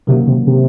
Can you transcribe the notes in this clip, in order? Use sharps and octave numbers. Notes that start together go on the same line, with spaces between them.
C3 D#3 F#3 A#3 C#4 F#4
C3
C3